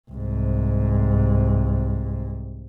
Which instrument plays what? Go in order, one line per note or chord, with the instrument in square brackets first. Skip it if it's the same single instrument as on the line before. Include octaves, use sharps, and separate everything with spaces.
[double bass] C2 G#2